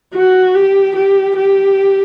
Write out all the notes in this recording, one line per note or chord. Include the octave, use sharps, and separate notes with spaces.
F#4
G4
G4
G4